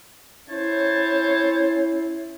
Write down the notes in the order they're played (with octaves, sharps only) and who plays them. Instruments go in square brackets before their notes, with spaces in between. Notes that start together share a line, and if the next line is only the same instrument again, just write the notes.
[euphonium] C#4 [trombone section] E4 [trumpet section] C5 C#5 A5